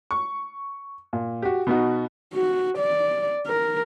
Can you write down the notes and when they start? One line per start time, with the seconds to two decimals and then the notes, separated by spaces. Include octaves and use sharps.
0.11 C#6
1.13 A#2
1.42 F#4 G4
1.67 B2 B3 D#4 F#4
2.34 F#4
2.78 D5
3.47 A#4